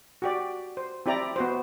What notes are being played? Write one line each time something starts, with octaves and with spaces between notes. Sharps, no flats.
F#4 G4 D5
C5
C4 E4 G4 D5 A#5
B3 F#4 C5